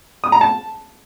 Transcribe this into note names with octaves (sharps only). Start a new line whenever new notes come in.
D#6
A#5
A5